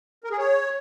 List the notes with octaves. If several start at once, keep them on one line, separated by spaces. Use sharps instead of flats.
A#4
G#4
C#5